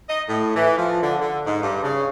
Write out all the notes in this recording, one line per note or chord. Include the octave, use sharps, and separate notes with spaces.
D#5
A2
E3
F3
D3
D3
G#2
G2
C#3